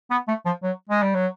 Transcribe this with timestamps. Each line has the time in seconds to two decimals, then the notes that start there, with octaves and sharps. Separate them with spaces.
0.11 B3
0.28 A3
0.46 F3
0.63 F#3
0.90 G#3
1.02 G3
1.14 F#3